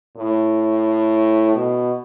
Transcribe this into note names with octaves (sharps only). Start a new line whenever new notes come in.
A2
B2